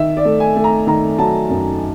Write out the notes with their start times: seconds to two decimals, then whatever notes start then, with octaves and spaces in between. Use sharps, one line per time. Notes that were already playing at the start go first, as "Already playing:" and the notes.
Already playing: D#3 E5
0.17 D5
0.25 A3
0.40 G#5
0.56 A3
0.64 A#5
0.87 D#3 A#5
1.19 F#3 A5
1.50 F#2